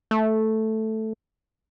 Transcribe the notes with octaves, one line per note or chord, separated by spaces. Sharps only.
A3